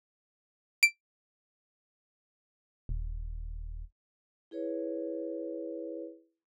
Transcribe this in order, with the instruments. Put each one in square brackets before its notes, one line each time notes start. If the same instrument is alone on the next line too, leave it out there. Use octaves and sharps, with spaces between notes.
[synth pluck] D7
[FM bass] D#1
[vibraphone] E4 G#4 B4 C#5